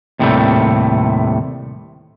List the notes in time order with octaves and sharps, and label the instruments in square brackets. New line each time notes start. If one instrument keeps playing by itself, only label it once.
[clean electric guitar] D#2 A2 C3 E3 G3 A3